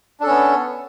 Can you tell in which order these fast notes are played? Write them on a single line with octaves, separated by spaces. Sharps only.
D4 A4 C#4 B3